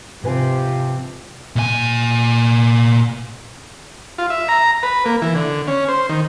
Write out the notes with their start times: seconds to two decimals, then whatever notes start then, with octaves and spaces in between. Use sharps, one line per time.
0.24 G#2 C3 F3 G4 B4 G#5
1.56 A#2 G#5
4.18 F4
4.30 E5
4.49 A#5
4.83 B4
5.06 A#3
5.22 E3
5.35 D3
5.68 C#4
5.89 C5
6.09 D#3